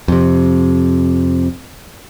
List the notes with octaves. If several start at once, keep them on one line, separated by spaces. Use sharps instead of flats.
F2 C3